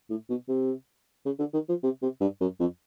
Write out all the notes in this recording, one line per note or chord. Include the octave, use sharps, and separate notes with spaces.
A2
B2
C3
C#3
D3
D#3
F3
C3
C3
G2
F#2
F2